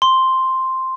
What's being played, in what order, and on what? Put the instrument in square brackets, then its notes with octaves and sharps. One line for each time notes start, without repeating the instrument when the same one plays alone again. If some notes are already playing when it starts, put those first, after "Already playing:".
[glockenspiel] C6